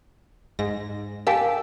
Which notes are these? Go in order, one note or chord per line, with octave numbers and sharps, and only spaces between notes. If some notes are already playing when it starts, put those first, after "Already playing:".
G#2 A#6
G4 A#4 F5 G#5 A5 E6